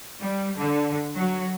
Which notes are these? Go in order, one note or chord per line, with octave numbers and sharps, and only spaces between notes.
G3
D3
F#3